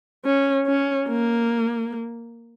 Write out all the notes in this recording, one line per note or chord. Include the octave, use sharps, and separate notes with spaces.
C#4
C#4
A#3